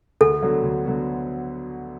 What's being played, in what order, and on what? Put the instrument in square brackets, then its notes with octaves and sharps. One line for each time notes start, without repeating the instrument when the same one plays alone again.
[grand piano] D2 [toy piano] A4
[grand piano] D3 F#3 B3 F#4
D2
D3 F#3 B3 F#4